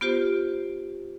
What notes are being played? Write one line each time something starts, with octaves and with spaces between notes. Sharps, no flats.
B3 F4 G4 C5